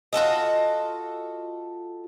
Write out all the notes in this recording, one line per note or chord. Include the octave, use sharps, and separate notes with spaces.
F4 F#4 A4 D#5